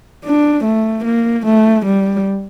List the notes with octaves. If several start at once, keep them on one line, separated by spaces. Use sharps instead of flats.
D4
A3
A#3
A3
G3